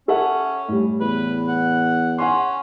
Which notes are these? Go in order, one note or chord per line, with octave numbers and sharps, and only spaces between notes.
C#4 A4 E5 F#5
A2 G3
E2 B4
F#5
C#4 F#5 G#5 C6